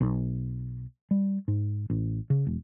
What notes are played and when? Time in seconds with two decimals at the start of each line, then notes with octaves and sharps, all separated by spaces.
0.01 B1
1.11 G3
1.48 G#2
1.90 A1
2.30 C#3
2.47 E1